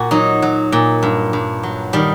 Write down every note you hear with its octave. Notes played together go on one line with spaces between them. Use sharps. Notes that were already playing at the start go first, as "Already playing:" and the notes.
Already playing: A#2 F#4
F#3 D#4
F#3
A#2
G2
G2
F#3
D#3 G3